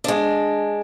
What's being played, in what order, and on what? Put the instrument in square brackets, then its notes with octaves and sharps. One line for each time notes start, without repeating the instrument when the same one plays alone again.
[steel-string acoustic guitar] G#3 D4